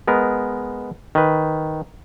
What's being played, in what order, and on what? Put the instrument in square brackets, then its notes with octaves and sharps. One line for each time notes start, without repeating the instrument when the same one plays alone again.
[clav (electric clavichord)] G#3 B3 A#4
D#3 B4